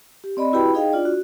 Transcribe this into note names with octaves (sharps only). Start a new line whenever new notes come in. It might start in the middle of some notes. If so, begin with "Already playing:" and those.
G4
C4 D5 D#5 B5
E4 F#4 G4 B4 G5 B5
D#4 G#4 D#5 F5 G5
D4 F4 D5
F#4